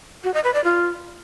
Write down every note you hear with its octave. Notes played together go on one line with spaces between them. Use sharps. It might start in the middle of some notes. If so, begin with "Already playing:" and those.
F#4
D#5
B4
D5
F4